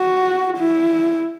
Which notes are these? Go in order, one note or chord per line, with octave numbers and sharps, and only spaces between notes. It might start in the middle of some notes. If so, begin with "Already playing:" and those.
Already playing: F#4
E4